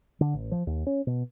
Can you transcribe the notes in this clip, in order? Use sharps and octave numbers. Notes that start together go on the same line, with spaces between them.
D3
A1
F3
D#2
C#4
B2